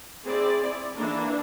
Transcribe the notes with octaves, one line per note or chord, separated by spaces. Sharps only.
C4 E4 G#4 D5
E3 A#3 D4